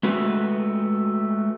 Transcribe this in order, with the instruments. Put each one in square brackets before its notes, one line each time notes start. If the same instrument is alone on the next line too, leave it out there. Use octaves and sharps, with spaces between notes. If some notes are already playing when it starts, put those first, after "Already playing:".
[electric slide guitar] G#3 A3 F#4 B4